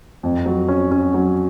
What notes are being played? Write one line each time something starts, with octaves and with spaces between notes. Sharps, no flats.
F2
F#3
C#4
C#4
F#3